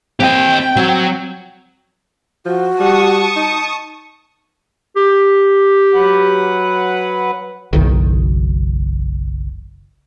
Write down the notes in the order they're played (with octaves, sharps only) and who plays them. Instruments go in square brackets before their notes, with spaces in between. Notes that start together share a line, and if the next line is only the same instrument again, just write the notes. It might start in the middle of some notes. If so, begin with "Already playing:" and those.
[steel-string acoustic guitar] C4 [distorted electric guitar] G4 D#5 [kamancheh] G5
[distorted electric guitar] F#3 [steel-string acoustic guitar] C4
[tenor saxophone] F3 [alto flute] F#4
[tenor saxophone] G3 [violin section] A5 C#6 D#6
[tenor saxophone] D#4
[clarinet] G4
[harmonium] F#3 B4 F#5
[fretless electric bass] F#1 B1 D#3